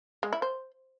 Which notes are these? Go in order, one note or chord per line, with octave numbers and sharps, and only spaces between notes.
G#3
E4
C5